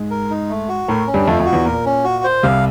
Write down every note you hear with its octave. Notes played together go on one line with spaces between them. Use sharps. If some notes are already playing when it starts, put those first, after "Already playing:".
Already playing: G#2 G#3
A#4
D#4
A3
F#4
A2 A3 A#4
C#4
G2 G3
F2 F3 A3
F2 F3
F#4
E2 E3
A#2 A#4
C#4
F#4
C5
C2 C3 F5